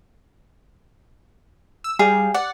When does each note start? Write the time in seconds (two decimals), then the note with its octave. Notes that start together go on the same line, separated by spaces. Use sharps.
1.84 E6
1.99 G3 G#4 F5 G5
2.34 D5 F#5